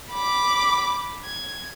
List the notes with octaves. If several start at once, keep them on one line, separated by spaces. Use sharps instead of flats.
B5 D6
G#6